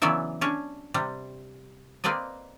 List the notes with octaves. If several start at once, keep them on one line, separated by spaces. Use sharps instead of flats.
C#3 E3 F#3 B3 D5 E5
C#4 D4 C#5
C3 G3
A#3 C4 B4 D5 D#5